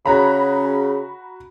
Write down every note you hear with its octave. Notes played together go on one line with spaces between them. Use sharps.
C#3 F#4 A#5 B5